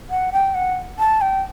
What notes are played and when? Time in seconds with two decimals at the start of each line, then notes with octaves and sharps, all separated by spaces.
0.10 F#5
0.33 G5
0.55 F#5
0.99 A5
1.21 G5